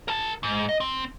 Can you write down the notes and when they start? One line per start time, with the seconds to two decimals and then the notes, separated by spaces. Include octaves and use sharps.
0.08 A#4 A5
0.43 G#2
0.69 D#5
0.80 C4